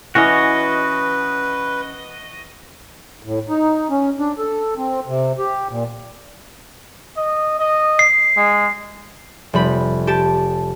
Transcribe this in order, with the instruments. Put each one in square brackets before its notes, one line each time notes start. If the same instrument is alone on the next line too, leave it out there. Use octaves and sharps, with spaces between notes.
[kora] E3 C#4 [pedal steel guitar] F#4 D#5 [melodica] B4
[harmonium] A2
D#4
C#4
D4
A4
C4
C3
G4
A#2
[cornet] D#5
D#5
[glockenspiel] C7
[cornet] G#3
[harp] F1 G3 B5
G4 A5 D7